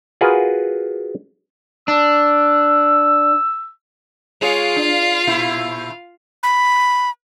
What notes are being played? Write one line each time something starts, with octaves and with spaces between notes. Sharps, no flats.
F4 F#4 G#4 A#4 B4
D4 E6
G#3 F4 G#4 C#5 F5
D4
A#2 E4
B5